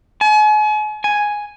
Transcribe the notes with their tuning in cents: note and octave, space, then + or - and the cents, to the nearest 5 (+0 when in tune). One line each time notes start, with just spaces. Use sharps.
G#5 +40
G#5 +0